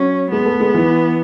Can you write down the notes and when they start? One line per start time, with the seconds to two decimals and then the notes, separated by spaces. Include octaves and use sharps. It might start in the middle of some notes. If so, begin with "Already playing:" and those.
Already playing: F#3 C#4
0.32 G#3 B3
0.46 A3
0.60 G#3
0.74 E3